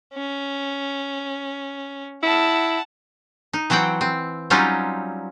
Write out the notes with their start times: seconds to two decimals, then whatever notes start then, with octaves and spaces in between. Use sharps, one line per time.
0.13 C#4
2.23 E4 F#5 A5
3.53 D#4
3.70 E3 F#3 C4 F#5 G5
4.01 C4
4.50 F#3 G3 C4 C#4 D#4 F4